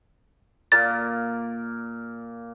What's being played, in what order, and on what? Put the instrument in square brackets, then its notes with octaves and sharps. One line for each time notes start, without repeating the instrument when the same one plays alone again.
[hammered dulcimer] A#2 A#3 [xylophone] A6